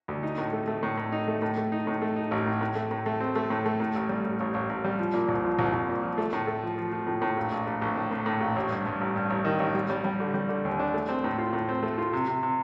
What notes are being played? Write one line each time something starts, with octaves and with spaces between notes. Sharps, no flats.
D2
D#4
A2
A3
A3
A2
A2
D#4
A3
A2
A3
D#4
A2
A3
D#4
A1
A2
A2
A3
A2
A3
C4
A3
A2
A3
A2
A1
G3
A1
A1
A1
A1
G3
F3
A#2
C2
F3
C2
C2
A#2
F3
A3
A2
A3
F3
F3
F3
A2
A2
A#1
A#1
A#1
A#1
A2
A2
A2
A#1
A1
G2
G2
A1
G2
A1
D#3
A1
G3
G3
G3
D3
G3
D3
D#2
D4
A3
C4
A2
F4
A2
C4
A3
F4
C3
C3
C3